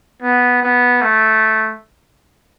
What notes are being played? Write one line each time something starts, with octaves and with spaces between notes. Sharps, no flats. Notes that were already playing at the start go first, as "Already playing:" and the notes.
B3
B3
A3